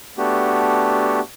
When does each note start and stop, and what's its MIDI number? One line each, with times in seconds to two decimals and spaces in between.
0.18 1.20 57
0.18 1.20 59
0.18 1.20 62
0.18 1.20 66
0.18 1.20 67